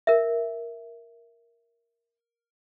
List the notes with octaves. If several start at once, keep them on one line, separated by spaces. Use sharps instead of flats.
A#4 E5